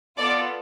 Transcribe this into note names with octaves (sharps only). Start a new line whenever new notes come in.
B3 F4 A4 D5